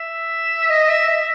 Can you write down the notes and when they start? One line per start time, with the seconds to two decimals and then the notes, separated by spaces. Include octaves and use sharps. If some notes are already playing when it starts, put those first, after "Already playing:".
Already playing: E5
0.69 D#5
0.89 E5
1.08 E5